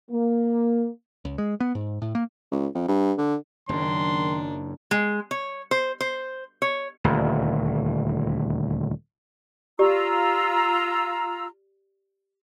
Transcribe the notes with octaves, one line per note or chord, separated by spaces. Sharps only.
A#3
C#2
G#3
B3
G#2
A2
A#3
C#2
F2
G2
D3
F#1 F#2 D#3 D4 D#4 C6
G#3
C#5
C5
C5
C#5
D#1 D2
F4 G4 D5 A#5 E6